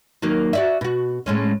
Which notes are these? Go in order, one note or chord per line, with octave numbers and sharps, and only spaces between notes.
D#3 F#3 A#3
F#4 D5 E5
B2 F#4
A2 G#3 C#4